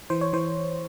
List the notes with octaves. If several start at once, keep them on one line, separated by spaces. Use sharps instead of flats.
E3 C5
C#5
E3 C5